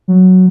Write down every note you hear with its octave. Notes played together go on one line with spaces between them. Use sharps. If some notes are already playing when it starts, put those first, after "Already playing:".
F#3